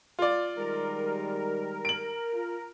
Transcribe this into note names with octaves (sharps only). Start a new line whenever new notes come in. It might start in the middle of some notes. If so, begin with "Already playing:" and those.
F4 D5
D#3 G3 G#3 A#4
D7 F#7
F4